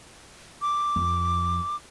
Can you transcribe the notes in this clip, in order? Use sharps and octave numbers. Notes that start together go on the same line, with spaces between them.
D6
F2